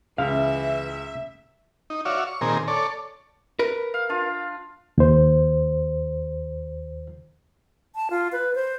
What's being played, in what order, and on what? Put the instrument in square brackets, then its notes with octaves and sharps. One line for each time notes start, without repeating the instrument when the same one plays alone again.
[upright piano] C#2 [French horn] E3 [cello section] E5 [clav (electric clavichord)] F5
[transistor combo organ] D#4
F#4 C#5 D5 E5 F5
C#6
A#2 D#3 C4 G#4 A#4
A4 C#5 D5
[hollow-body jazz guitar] A#4 B4
[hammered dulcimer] F5
D4 F4
[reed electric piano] D#2 C5
[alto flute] A5
F4
B4
C5